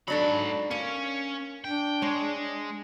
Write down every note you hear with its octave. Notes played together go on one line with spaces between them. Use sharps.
G#2 F#3 D4 A4 B5
A#3 C#4
D4 G5
G#3 C#5